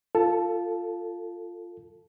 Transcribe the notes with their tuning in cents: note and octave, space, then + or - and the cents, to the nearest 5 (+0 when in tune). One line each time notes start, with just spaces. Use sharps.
F4 +0 A4 +20 A5 -15